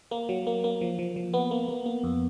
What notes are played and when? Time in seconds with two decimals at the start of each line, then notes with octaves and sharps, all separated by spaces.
0.11 A#3
0.29 F#3
0.47 A#3
0.64 A#3
0.81 F3
0.99 F3
1.16 F3
1.34 B3
1.51 A#3
1.68 A#3
1.86 A#3
2.04 F2